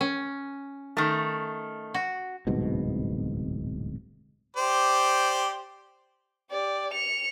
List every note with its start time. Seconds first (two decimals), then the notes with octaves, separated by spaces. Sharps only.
0.01 C#4
0.97 D#3 A3
1.94 F#4
2.47 D1 C2 G#2 B2
4.57 G4 C5 D5
6.51 G4 D5
6.94 C#7 F7